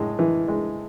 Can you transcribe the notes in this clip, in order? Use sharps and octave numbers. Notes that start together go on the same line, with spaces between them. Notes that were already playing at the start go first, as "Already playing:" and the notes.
Already playing: A2 G#3
E3
G#3